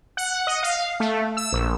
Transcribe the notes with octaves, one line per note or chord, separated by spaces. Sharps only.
F#5
D#5
F5
A3
E6
A#1